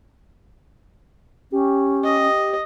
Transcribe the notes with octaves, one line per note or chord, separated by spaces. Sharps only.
C#4 G4
D#5